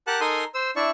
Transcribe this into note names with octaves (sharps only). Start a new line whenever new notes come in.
G4 A#4 F#5 A5 F#6
D#4 A4 A#4 G#5 C6 D#6
C5 E6
D4 E4 D5 E5 C#6